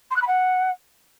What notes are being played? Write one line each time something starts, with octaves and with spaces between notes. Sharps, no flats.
C6
F#6
B5
F#5